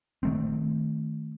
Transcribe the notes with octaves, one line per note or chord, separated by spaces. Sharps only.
D#3 A3 C4